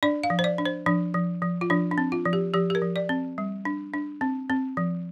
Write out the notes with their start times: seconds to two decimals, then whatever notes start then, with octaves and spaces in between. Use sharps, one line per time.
0.03 D4 D5
0.24 F5
0.30 F3
0.39 C5
0.44 D5
0.58 D4
0.65 C5
0.86 F3 D4
1.14 F3
1.42 F3
1.61 F4
1.70 F3 D4
1.91 D4
1.98 C4
2.12 F4
2.25 F3
2.33 G4
2.54 F3 G4
2.70 G4
2.75 A#4
2.82 F3
2.96 D5
3.09 C4
3.38 G3
3.65 D4
3.94 D4
4.21 C4
4.50 C4
4.77 F3